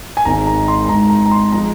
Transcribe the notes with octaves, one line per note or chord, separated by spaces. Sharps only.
G#5
G#1 G#2 D#3 G#3 A#5
A#5
C6
C6
G#1 G#2 D#3 G#3 A#5
A#5
A#5
C6
F3 G#3 A#5